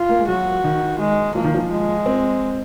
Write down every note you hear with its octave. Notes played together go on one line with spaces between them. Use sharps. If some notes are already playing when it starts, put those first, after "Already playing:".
Already playing: F4
A#3
G#3
F#3 F#4
D#3
G#3
F3 A#3
D#3
F3
G#3
C4